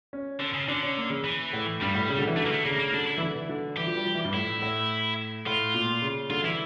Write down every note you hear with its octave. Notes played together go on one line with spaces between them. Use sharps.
C#4
D3 C#4
C#3
D3 D4
C#4
A#3
C#3
E3
A2
G2 G3
A2
C#3
D3
E3
D3 A3
A#3
A3
C#3 A#3
A#3
D3 D4
E4
E3
D3
E3
D3
E3 G4
F3
G3
F3
E3
G2
A2 E4
A2
A2 F4
A#2
C#3
D3 F4
E3 E4